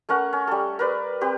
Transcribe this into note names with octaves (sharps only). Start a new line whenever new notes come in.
A3 C#4 A#4 F#5
C#4
G3 A4
A#4 B4 D5
C4 G4 B4